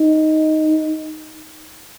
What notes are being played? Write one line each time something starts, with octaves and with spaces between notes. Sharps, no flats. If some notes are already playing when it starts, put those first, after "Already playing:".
Already playing: D#4